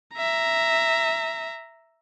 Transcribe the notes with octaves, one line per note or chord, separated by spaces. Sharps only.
E5 A#5